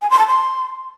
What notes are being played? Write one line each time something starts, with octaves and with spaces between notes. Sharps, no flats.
G#5
C6
A5
C6